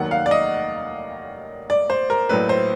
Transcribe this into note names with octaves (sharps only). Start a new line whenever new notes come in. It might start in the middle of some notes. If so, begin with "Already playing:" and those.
Already playing: F1 D#2 D#3 F#3 F#5
F5
D5
D#5
D5
C5
A#4
A#1 A2 F#3 A3 B4
C5